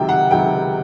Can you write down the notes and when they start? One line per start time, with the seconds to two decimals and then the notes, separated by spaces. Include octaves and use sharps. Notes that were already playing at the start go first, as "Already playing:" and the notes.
Already playing: C#2 C3 D#3 F#3 G5
0.09 F#5
0.31 C#2 C3 D#3 F#3 G5